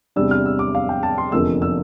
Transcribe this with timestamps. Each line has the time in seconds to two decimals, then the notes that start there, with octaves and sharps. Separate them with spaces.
0.16 E2 C3 G3 D4 E6
0.31 F6
0.46 E6
0.59 D6
0.75 F5
0.89 G5
1.03 A5
1.18 C6
1.32 F1 E2 D3 F3 A#3 E6
1.62 E6